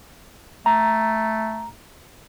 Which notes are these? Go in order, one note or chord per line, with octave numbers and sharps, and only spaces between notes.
A3 A#5